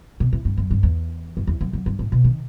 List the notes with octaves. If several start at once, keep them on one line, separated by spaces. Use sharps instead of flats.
B2
A2
G2
F#2
G2
E2
F#2
E2
F#2
F#2
G2
A2
B2
D#3